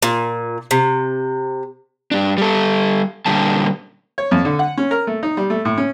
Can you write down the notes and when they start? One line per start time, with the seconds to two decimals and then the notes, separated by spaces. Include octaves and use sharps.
0.03 A#2
0.71 C3
2.11 G2 D4
2.38 G3 A4
3.26 A#2 D3 G3 A5
4.18 C#5
4.31 F2
4.45 D3
4.59 F#5
4.77 C#4
4.91 A#4
5.07 A3
5.23 D#4
5.37 G3
5.50 A3
5.65 A2
5.78 C#4